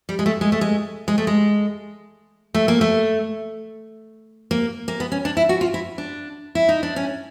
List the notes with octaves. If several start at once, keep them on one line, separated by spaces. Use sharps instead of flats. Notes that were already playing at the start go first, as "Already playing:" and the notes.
G3
G#3
A3
G#3
A3
G#3
G#3
A3
G#3
A3
A#3
A3
A#3
A#3
B3
C#4
D4
E4
F#4
F4
E4
D4
E4
D#4
D4
C#4